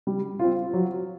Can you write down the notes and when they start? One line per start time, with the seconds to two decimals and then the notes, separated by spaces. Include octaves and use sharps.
0.07 G3
0.39 C4 F4
0.74 F#3